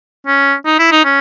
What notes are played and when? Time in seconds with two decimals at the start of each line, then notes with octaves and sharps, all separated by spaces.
0.27 C#4
0.66 D#4
0.79 E4
0.92 D#4
1.05 C#4